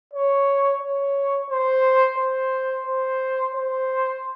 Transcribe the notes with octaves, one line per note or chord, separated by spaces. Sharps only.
C#5
C#5
C5
C5
C5
C5